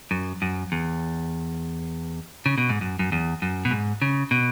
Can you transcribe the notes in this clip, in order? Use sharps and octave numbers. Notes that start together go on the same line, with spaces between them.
F#2
F#2
E2
C#3
B2
G#2
F#2
F#2
E2
F#2
B2
G#2
C#3
B2